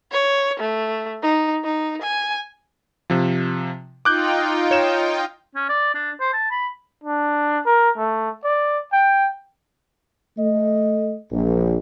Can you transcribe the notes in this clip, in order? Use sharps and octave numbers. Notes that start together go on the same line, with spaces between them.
C#5
A3
D#4
D#4
G#5
C3 F3
D#4 F4 G5 D6 F#6 G6
C#5 E7
C#4
D5
D4
C5
A5
B5
D4
A#4
A3
D5
G5
A3 D#5
A#1